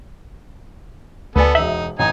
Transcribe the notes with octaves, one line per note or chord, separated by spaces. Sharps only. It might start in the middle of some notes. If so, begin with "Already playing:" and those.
D2 B3 A4 B4 D5 G#5
E1 D#4 E5 F#7
A1 D#4 G#5 A#5